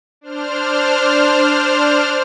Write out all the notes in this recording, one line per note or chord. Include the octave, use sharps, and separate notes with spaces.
D4 C5 F6